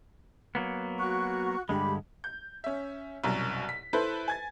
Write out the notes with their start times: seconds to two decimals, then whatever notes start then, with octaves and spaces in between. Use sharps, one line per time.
0.55 F#3 A#3 B3
0.99 F#4 C#6 F#6
1.69 G2 D3 G#3 G4 B5
2.24 G6
2.64 C#4 E5
3.24 C2 F#2 B2
3.69 B6
3.93 E4 A4 B4 C5 E5
4.28 G#5 G#6 A6